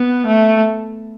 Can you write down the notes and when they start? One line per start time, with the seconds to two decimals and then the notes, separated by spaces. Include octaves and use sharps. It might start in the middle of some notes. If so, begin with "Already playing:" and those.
Already playing: B3
0.27 A3